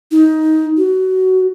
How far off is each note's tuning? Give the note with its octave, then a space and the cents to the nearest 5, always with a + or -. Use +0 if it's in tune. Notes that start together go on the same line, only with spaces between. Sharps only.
D#4 +15
F#4 +20